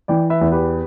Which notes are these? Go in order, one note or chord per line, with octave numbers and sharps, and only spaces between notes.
E3 D5 G5
B4 E5
E2
G4 B4